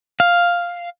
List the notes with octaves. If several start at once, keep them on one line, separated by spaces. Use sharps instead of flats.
F5